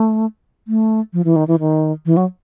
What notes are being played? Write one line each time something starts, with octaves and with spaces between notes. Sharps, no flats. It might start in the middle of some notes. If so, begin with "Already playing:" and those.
Already playing: A3
A3
F3
E3
D#3
E3
D#3
E3
F#3